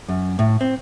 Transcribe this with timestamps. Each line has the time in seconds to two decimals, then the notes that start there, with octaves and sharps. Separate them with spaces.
0.09 F#2
0.39 A2
0.61 C4